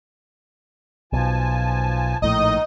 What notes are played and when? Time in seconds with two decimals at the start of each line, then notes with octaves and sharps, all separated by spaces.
1.13 B1 F3 G#5 A5
2.22 A#1 A2 D#3 D#4 D#5